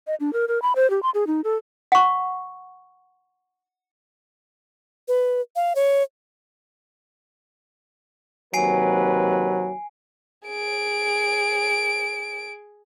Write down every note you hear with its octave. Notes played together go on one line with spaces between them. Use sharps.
D#5
D4
A#4
A#4
B5
C5
G4
C6
G#4
D#4
A4
F#5 C#6
B4
F5
C#5
D#2 C3 F#3 B4 G#5 C7 D7
G#4 D7